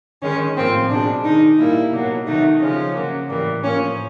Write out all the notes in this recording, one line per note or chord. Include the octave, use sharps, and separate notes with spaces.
D#3 G#3 C#4
A2 F3 A#3 C4
B2 G#3 D4
D#3 G#3 D#4
A#2 G3 A#3 E4
B2 F#3 A#3
C3 D#3 F#3 A3 D#4
C#3 F3 G#3 C#4
C#3 F#3 A#3
A2 E3 G3 A#3
A2 F3 A#3 C#4